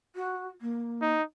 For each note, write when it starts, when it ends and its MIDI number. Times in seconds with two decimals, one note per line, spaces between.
0.16 0.47 66
0.61 1.12 58
1.01 1.23 63